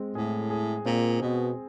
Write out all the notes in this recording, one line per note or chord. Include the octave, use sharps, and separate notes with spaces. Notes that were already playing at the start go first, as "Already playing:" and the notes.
Already playing: G#3 C4
A2 G#4
G#4
A#2 C4
B2 C4